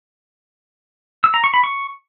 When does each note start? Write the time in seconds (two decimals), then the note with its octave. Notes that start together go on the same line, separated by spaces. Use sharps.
1.24 E6
1.34 A#5
1.44 C#6
1.54 B5
1.64 C#6